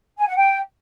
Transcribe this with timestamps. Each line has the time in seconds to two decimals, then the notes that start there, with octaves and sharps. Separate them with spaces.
0.18 G#5
0.27 F#5
0.36 G5